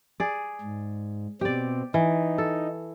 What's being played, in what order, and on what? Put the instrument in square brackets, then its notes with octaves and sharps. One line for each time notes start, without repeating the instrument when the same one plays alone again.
[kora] G#4 D5
[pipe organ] G#2
[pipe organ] B2 C4 [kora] G4 D5
[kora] E3 [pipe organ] D#4
[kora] A4